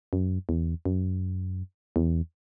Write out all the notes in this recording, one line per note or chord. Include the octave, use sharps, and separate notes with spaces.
F#2
E2
F#2
E2